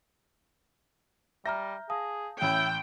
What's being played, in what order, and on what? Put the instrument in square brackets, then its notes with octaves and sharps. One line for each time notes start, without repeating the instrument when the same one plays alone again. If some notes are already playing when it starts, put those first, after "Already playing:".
[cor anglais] G3 [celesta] E5 A#5 F6 [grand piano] G6 A#6
[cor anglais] G#4 [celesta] F5 A5 D#6
[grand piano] A1 C#4 [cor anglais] E4 [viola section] G5